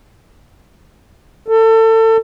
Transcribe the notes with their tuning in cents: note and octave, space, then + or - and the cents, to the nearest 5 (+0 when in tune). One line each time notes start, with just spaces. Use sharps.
A4 +30